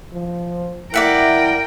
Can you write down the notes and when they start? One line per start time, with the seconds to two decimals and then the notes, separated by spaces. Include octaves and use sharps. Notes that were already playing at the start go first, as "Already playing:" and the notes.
0.13 F3
0.94 E4 A#4 D5 E5 F#5 G5